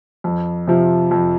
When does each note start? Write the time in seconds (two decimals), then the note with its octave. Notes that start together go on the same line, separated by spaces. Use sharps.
0.24 F2
0.67 C3 F3
1.11 F2